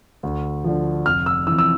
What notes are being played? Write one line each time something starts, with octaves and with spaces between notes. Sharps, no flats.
D2
D3 F3
F1 F6
E6
F2 E3 E6
E6